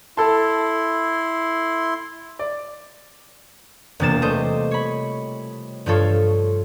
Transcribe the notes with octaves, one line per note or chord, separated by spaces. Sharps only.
E4 A4 A5 C6
D5
E1 C3 A#3 F4 A6 E7
G3 A3 C5 D#5
C#5 B5
G2 F3 F4 A4 C#5